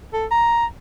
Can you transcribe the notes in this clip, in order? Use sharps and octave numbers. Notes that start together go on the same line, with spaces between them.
A4
A#5